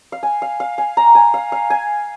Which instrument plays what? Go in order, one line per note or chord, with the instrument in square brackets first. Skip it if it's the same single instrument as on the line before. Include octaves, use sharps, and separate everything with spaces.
[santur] F5
G#5
F5
F5
G#5
A#5
G#5
F5
F5
G#5